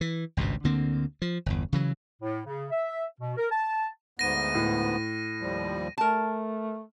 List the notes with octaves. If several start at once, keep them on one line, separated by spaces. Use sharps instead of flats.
E3
G#1 C#2 G2 B2
D2 D3 A#3 C4
F3
G1 E2
C#3 E3 F#3
A2
C#3
E5
B2
A#4
A5
D2 G#2 B3 A#6 D#7
A2
D#2 F3 G3
A3 A#4 A5